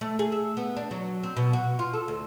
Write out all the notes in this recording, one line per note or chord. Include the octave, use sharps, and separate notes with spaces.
A3
G#4
E5
B3
D4
F#3
C4
B2
F#4
F4
A4
D2